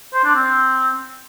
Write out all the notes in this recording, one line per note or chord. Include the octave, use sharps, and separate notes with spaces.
C5
D4
C4